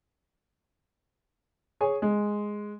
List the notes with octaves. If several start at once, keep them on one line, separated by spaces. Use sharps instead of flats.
G#4 C#5 G#5
G#3